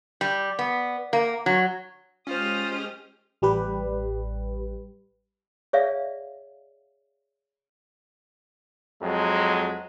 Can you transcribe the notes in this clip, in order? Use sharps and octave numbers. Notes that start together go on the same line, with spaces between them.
G3
B3
A#3
F#3
G#3 C#4 F4 G4 C5 D#6 F6
A1 G3 G4 B4
G#4 C#5 D5 E5 F5
F2 F#3 G#3